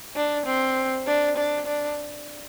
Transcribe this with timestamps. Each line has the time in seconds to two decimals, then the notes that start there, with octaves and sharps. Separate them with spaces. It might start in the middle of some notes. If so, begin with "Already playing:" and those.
0.16 D4
0.45 C4
1.07 D4
1.37 D4
1.66 D4